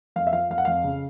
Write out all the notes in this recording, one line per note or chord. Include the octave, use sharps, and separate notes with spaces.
F2 F5
E5
F3 F5
F2 F5
F#5
F2 F5
C#3